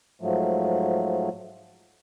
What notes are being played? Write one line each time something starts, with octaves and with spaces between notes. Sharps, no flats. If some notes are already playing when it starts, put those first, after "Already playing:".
G#2 F3 F#3 A3